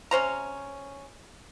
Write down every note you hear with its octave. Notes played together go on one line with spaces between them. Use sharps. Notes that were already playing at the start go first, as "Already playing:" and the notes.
C3 C#4 C5 A#5